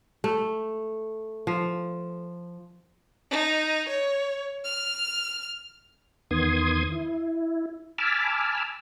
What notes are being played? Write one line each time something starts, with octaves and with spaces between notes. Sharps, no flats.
A3
F3
D#4
C#5
F6
E2 D#3 B3 C6 D#6 G#6
E4
G#5 A5 B5 D6 E6 F6